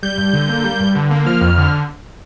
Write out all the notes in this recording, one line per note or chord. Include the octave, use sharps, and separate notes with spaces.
G3 G6
G2
D3
A#3
G3
G2
D3
A#3
F3 F6
F2
D3